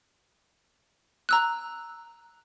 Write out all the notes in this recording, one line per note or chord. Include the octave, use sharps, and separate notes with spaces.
A#5 E6 F#6